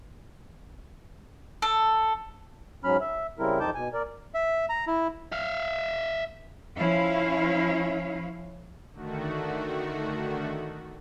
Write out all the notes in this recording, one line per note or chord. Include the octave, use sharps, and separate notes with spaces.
A4
G#2 F#3 C#4 B5 F6
E5
C#3 G3 C4 E4 A#4
F2 C4 D#4 A5 D6 G6
B2 G#5
A#4 D5
E5
A#5
E4
E5 F5
F3 C#4 E4 F5
D3 D#3 A3 F#4